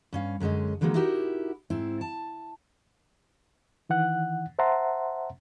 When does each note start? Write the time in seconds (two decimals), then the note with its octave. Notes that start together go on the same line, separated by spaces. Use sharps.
0.13 G2 C#4 F5
0.40 F#2 D3 G#3 C#4 D#5
0.81 D3 E3 F#3 G#3 A#3 B3
0.94 D#4 E4 F#4 G4 A#4
1.70 G#2 C4 E4
2.01 A5
3.89 D#3 E3 F#5 F#6
4.59 C5 E5 F#5 A5 A#5 C6